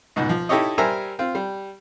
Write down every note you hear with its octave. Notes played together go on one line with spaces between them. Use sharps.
C#2 G#2 B2
F3
D#4 E4 G4 A4 C#5 D#5
G3 A#4 C5 E5 G#5 A#5
C4 F4
G3